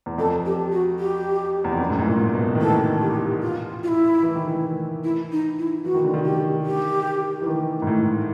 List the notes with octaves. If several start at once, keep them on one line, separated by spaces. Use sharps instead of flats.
E2
F2 A4
G4
F#4
G4
E2
F2
F#2
G#2
A2
A#2
B2
D#3
E3 A4
G4
F4
F4
E4
E3
D#3
E3
E4
D#4
E4
E3 F#4
D#3
D3
D#3
G4
G4
E3
D#3
G#2
A2